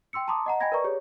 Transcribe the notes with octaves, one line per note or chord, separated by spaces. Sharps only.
G5 C6 E6 C#7
A5 A#5 C6 D6 D#6
D#5 F#5 A#5
D#5 G5 G#5 B5 G#6 A#6
A#4 B4 D5 A#5 C#6
G4 G#4 C#5